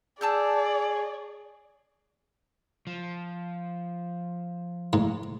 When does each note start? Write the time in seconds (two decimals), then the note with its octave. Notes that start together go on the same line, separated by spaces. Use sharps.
0.21 G#4 D5 A5 E6 G6
2.87 F3
4.93 G#2